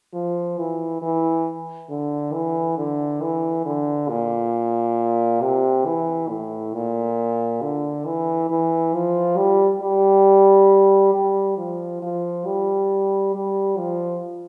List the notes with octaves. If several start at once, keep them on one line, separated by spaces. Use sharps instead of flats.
F3
E3
E3
D3
E3
D3
E3
D3
A#2
C3
E3
A2
A#2
D3
E3
E3
F3
G3
G3
G3
F3
F3
G3
G3
F3